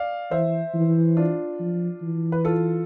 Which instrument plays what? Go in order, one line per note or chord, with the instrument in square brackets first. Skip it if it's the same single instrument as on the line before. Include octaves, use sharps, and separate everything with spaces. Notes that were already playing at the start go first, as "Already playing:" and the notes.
Already playing: [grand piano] D5 F5
[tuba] E3 [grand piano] C5 E5
[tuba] E3
[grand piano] D4 F4
[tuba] F3
E3
[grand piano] B4
F4 A4